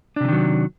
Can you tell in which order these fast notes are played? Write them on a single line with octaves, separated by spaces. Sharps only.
D4 C3 E3 D#3 F#3